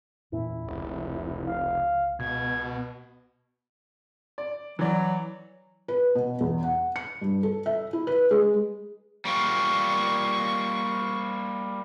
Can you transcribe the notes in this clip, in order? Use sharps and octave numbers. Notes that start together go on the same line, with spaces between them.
E2 A#2 C#4 E4
F1 C#2
F5
C#2 B2 G#6
D5
E3 F#3 D5
B4
B2
E2
F#5
C#7
G2
A4
E5
E4
B4
G#3
G3 A#3 F4 C#6